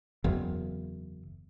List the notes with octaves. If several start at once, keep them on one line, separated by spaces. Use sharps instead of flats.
F#1 E2